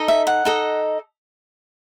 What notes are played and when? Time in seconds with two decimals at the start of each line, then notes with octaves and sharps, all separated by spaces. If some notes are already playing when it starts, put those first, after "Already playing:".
Already playing: D#4 A4 D#5
0.08 E5
0.27 F#5
0.45 D#4 A4 D#5